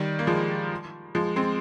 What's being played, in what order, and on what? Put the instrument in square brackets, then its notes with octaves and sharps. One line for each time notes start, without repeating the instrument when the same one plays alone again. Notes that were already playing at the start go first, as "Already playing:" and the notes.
Already playing: [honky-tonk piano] D#3 G3
A#3
F3 G#3
F3 G#3
G#3 C4